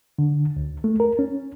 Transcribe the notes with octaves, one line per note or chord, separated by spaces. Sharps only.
D3
D2
A3
A#4
C#4